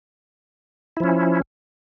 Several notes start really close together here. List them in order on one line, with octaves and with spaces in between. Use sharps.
E4 F3 C#4